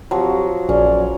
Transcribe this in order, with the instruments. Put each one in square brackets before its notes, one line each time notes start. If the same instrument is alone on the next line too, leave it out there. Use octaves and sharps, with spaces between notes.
[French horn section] F2 G4 [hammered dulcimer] F3 F#3
[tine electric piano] A#1 [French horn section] F#2 F#3 D5 [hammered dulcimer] C#4